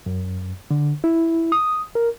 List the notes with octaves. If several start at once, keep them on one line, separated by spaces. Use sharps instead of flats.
F#2
D3
E4
D#6
A#4